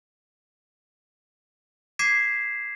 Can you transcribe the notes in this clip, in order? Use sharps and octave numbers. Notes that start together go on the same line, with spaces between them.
D6 G#6 B6 C7 D#7 E7